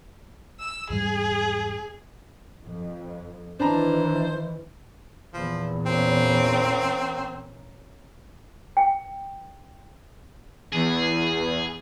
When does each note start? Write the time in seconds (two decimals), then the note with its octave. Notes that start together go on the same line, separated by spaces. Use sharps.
0.59 E6
0.90 E2 G#2 G3 G#4
2.65 F2
3.60 D#3 E3 D4 C5 A5 A#5
5.33 E2 A#2 F3
5.86 A#3 C4 C#4
8.77 G5
10.73 E2 G#4